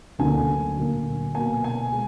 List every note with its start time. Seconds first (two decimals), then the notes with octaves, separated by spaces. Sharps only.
0.19 D2 D3 F#3 A#3 G#5
0.77 A#2 F#3 A#3
1.35 B2 A#3 G#5
1.64 G#5
1.92 G#3